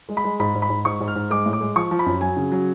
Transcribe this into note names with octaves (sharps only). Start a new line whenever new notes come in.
G#3
B5
G#3
G#2 B5
G#2
B5
G#2
G#2 C#6
G#2
F6
G#2
G#3 D6
A2
D6
G#3
F3 C#6
F3
B5
F#2
F#3 G#5
C#3
F#3